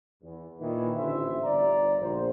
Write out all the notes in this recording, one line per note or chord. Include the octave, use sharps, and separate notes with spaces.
E2
A#2 D#3 E3
A1 D3 F4 C5 E5
G1 D5 A#5
A#1 C5